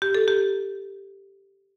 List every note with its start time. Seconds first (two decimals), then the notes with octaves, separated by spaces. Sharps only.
0.02 G4
0.15 A4
0.28 G4